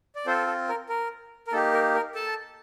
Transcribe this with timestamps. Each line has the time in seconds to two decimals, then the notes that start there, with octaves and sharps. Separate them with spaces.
0.15 D5
0.26 C4 F4 A4 C5
0.47 A4
0.69 A#4
0.89 A#4
1.47 A#4
1.52 A#3 D#4 G4 A4
1.73 A#4
1.95 A#4
2.15 A4 A5